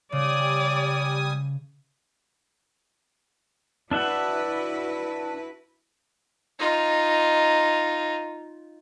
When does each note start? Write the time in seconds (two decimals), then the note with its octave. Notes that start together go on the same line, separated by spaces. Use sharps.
0.12 C#3 G3 D5 G#5 D#6
3.91 D4 E4 F#4 B4 E5 F#5
6.59 D#4 F4